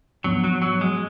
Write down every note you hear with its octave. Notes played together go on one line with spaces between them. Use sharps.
G#2 F3 F#3 B3 D4
F#3
F#3
G#3